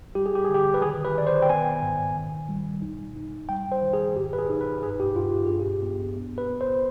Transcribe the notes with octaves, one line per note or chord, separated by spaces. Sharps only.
G3 G4
G#4
G4
D3 G#4
G4
B4
D#3 G#4
B4
D#3 D5
C5
G5
B3 G#5
G#2
D#3
G3
D#4
D#4
G3 G5
C5
D#3
G#4
G#2 G4
B4
G#4
D#4
B4
G2 G#4
G4
G2 F4
G4
D4 G#4
G4
B3
B3
B4
B3
C5